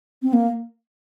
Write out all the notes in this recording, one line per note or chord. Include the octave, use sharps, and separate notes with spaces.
C4
A#3